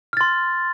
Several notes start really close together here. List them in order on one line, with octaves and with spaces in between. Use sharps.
F6 A6 C6